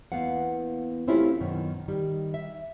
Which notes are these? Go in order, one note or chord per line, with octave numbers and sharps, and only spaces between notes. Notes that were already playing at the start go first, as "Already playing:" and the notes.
E2 A#3 B3 F5 F#5
A3 C4 C#4 E4 F4 G4
F#2 B2 D#3
D#3 G3
E5